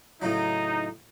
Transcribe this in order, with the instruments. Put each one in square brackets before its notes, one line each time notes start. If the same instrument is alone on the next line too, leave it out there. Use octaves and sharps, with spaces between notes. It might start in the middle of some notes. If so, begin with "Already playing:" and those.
[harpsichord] A2 C#3 F#3 [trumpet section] D#4